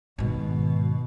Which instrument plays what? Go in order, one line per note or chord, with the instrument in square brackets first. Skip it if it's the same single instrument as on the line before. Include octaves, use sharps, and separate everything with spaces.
[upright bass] G#2 D#3 [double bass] B2